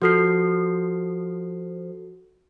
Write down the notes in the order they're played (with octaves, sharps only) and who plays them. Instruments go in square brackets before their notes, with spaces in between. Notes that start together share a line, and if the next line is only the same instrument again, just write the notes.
[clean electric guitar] F3 [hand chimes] F#4 A4 C7